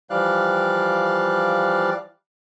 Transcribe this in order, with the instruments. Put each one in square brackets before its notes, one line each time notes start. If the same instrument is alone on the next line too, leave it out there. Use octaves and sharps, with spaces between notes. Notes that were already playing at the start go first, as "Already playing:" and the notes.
[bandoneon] E3 F3 G3 D5 F5 F#6